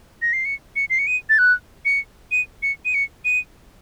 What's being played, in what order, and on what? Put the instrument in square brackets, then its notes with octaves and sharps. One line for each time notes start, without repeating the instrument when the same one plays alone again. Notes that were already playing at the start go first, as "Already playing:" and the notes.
[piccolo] A#6
C7
C#7
C#7
C7
C#7
D#7
A6
F#6
C#7
D#7
C#7
D#7
C#7
D#7